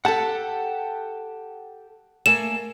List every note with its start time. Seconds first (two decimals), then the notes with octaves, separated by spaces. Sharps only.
0.05 G4 A4 F#5 A5
2.26 A3 A#3 G#5 E7